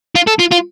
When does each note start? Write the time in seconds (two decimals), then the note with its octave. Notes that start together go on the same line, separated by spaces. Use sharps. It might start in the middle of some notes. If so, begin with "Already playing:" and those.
0.16 F4
0.27 A4
0.40 F4
0.52 F4